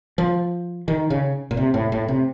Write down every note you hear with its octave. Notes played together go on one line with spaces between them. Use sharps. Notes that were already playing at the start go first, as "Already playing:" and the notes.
F3
D#3
C#3
A#2
C3
A2
A2
C3